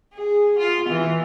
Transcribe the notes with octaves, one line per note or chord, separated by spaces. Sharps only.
G#4
F4
E3